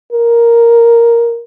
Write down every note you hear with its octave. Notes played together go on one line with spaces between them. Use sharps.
A#4